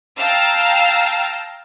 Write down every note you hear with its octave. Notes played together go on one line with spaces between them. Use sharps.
F5 G5 A5 A#5 E6 F6